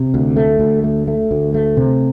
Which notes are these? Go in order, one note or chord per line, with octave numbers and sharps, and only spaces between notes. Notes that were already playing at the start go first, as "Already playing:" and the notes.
Already playing: C3
D2
A3
D2
A3
A3
D2
A3
C3